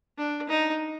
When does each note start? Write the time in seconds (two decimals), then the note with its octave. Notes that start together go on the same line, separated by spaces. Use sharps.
0.18 D4
0.49 D#4